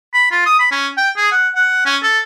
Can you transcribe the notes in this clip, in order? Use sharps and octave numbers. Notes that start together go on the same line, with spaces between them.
B5
F4
D#6
B5
C#4
G5
G#4
F#5
F#5
C#4
A4